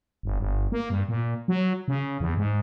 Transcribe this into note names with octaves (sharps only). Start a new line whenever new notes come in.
G1
G1
A#3
G2
A#2
F#3
C#3
E2
G#2